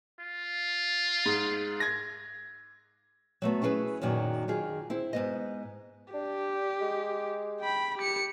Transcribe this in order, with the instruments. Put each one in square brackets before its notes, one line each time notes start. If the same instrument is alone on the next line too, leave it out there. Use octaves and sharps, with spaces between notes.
[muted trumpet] F4
[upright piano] G#2
G#6 A#6
[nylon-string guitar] F#3 A3 B3
C#4 E4 G#4 A#4 B4
F#2 A#2 D#3 F#3
D#3 F4 G#4
C4 E4
G#2 B3 D#5
[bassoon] D4 [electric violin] G4
[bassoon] G#3
[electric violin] G5 B5
G4 C#7